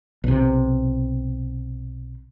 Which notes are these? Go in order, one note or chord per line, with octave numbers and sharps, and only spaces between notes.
B1 C3